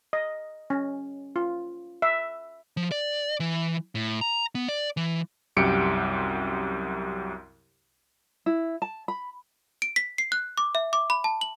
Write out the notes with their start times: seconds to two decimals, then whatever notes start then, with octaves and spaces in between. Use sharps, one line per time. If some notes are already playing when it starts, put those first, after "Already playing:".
0.13 D#5
0.70 C#4
1.36 F4
2.02 E5
2.77 F3
2.91 D5
3.40 E3
3.95 A2
4.21 A#5
4.55 B3
4.68 D5
4.97 E3
5.56 C2 F#2 G4 C#7 D7
8.46 E4
8.82 A5
9.08 B5
9.82 D7
9.96 B6
10.18 C7
10.32 F#6
10.58 D6
10.75 E5
10.93 D6
11.10 B5
11.24 A5
11.41 F#7